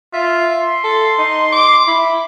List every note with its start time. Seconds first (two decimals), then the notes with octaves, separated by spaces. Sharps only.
0.14 F4 E5
0.52 C6
0.84 A4
1.18 D#4
1.52 D6
1.88 E4